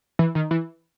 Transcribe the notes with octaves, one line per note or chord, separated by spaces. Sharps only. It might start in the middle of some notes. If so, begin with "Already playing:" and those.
E3
D#3
E3